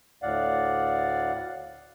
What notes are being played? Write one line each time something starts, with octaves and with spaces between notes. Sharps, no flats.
D2 A2 D5 F5 F#5